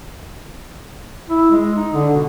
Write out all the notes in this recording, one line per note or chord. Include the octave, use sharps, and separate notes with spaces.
E4
G#3
D#4
D3
B2